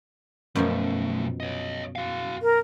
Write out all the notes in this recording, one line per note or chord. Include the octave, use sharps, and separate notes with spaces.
B1 F#2 B2 F3 A3
C#5 D#5
F#4 F5
A#4